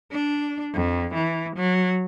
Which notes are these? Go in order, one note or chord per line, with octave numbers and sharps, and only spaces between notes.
D4
F2
E3
F#3